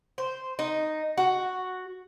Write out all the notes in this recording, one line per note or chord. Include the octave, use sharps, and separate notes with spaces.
C5
D#4
F#4